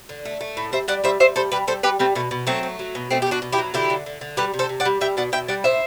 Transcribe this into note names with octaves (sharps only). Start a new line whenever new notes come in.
D3
A3
A3
A2
G3 C5 E5
G3 D5 F#5
G3 C5 E5
G3 C5 E5
G3 A4 C5
G3 G4 B4
G3 A4 C5
G3 G4 B4
G3 A3 C4
B2 A3
B2
F#3 A3 C4
A3
F#3
B2
B2 A3 C4
G4
A3
D4 F#4
B2
E4 G4
F#3
D3 E4 G4
D3
D3
D3
G3 G4 B4
C3
A4 C5
C3
D5 F#5
G3
G3 E5 G5
B2 D5 F#5
B2 E5 G5
G3 D5 F#5
A2 C5 E5